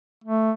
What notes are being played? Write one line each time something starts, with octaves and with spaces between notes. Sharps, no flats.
A3